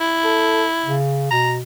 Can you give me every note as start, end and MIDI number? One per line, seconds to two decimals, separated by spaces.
0.01 0.95 64
0.24 0.64 69
0.85 1.31 49
1.31 1.62 47
1.31 1.53 82